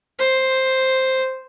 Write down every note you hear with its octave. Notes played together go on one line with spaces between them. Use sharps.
C5